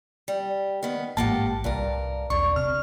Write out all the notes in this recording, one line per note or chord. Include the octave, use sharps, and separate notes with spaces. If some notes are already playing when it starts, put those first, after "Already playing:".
G3
D#3 B3
A1 G#2 A#3 G4 F#5 A5
C2 G2 A#4
E1 B1 D4 C#6
C3 F6